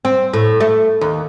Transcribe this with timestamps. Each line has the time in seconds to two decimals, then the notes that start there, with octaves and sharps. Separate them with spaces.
0.05 C4
0.33 A2
0.60 A3
1.01 D#2